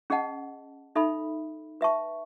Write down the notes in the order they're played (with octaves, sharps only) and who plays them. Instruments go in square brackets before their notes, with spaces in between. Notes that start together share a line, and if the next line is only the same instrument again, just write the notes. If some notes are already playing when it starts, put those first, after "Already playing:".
[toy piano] C#4 G#4 D#5 F#5 A5
D#4 A4 E5 B5
B4 E5 A5 C#6